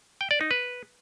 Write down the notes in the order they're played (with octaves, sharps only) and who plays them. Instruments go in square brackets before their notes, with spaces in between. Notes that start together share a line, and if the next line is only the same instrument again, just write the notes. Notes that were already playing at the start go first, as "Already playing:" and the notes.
[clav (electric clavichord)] G5
D5
D#4
B4